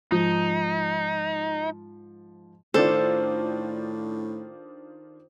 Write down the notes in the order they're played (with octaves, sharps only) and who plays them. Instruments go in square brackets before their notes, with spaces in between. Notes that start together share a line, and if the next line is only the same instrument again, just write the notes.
[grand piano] G#2 F3 [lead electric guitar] D#4
[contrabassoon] A2 [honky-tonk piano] D#3 D4 F4 [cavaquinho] A4 [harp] C5